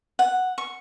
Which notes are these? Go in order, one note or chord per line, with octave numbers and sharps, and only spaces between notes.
F#5
C#6